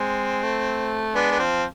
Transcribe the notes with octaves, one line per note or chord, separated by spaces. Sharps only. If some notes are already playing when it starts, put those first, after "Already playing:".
Already playing: G#3 C4
A3
G#3 B3 D4
B3
F3 C4